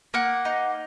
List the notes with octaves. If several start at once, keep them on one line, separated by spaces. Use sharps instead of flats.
A#3 F#5
D#4